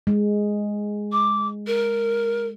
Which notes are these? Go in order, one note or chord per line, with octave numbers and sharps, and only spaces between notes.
G#3
D6
A#4